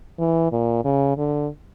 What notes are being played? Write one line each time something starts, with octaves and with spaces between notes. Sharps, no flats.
E3
A#2
C#3
D3